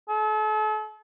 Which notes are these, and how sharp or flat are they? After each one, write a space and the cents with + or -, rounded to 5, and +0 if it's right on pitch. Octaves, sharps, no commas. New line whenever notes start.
A4 -40